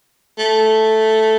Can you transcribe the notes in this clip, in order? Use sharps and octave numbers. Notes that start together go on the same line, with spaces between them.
A3